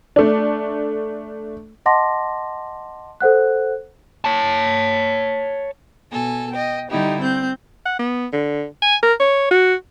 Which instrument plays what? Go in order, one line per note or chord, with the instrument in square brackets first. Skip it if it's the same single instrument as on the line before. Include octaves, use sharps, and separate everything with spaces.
[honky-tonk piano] A3 D4
[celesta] D#5 F#5 A5 C6 D6 A#6
A4 C5 F#5 F#6
[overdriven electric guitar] C#5 A5
[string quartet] B2 A4 G#5
D#5 G5
D3 G3 D#4 E4 G4
C4 G6
[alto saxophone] F#5
B3
D3
G#5
A#4
C#5
F#4